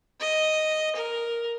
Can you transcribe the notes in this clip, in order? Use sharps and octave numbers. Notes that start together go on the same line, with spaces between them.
D#5
A#4